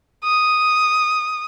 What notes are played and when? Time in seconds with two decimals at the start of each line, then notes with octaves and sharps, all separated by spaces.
0.24 D#6